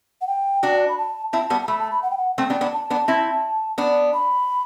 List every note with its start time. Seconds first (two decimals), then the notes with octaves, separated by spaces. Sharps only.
0.21 F#5
0.27 G5
0.63 D4 F#4
0.89 B5
0.98 A5
1.33 C4 E4 A5
1.50 G3 B3
1.63 A5
1.67 A3 B5
1.80 A5
1.92 B5
2.03 F#5
2.11 G5
2.18 F#5
2.38 A3 C4 G5
2.50 B3 D4
2.61 B3 D4
2.73 A5
2.90 B3 D4
3.08 C4 E4
3.78 B3 D4
4.14 B5